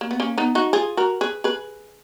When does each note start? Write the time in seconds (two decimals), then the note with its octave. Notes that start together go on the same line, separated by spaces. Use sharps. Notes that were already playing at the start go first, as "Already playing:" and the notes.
0.01 A#3
0.11 B3
0.20 A#3 C#4
0.38 B3 D#4
0.55 D#4 F#4
0.73 F4 G#4
0.97 F#4 A#4
1.21 G#4 B4
1.44 G#4 B4